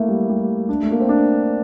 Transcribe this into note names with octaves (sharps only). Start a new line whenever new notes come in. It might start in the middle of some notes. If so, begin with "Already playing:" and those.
Already playing: A3 A#3 E4
G3
G3
D4
A3
A#3
C4
D4